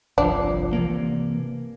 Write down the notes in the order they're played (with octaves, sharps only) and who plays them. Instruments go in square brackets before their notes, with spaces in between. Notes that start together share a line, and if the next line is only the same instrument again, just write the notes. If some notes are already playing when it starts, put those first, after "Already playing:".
[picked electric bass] G1 C2 F3 [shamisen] D4
[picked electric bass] C3 E3 A#3